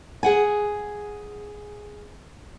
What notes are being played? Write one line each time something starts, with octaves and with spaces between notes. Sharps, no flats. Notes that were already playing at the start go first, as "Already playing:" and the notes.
G#4 F#5 G#5